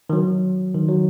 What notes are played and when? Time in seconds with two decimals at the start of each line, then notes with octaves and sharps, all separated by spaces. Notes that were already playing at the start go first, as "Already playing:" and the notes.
0.10 D#3
0.13 F#3
0.74 D#3
0.89 F#3